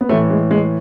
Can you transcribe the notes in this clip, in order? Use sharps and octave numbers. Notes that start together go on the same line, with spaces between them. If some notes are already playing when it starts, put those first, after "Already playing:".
B3
A2 E3 A3
G#3
G#3